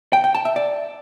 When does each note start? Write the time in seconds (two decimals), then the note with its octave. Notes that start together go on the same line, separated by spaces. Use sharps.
0.13 G5
0.24 G5
0.35 A5
0.45 E5
0.56 D5